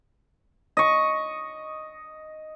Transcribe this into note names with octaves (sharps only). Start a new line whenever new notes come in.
D#5 C#6